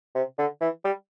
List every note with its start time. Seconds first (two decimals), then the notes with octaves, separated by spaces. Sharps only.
0.15 C3
0.38 D3
0.61 E3
0.85 G3